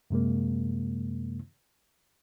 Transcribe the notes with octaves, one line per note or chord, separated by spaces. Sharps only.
F#2 C3 G#3 A#3